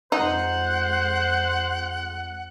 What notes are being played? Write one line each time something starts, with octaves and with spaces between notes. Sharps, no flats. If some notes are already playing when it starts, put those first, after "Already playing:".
F2 G#3 D#4 C5 F#5